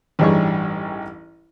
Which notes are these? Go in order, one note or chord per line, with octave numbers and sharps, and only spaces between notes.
A1 G2 G3 D#4 G#4 C#5